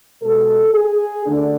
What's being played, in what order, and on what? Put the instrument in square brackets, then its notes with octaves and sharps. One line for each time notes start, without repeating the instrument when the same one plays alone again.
[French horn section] B2 G#3 A4
G#4
D2 D3 A3 D4